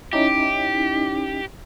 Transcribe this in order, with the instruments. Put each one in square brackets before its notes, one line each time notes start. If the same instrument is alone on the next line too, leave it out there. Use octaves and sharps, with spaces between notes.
[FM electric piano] C#4 D#4 E4 [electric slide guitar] G4